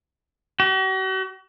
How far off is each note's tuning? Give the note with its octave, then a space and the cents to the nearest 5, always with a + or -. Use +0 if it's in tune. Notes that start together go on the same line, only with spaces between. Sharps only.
F#4 +45